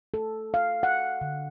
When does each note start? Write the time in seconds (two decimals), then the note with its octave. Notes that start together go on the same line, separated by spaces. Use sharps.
0.14 A4
0.54 F5
0.83 F#5
1.21 D3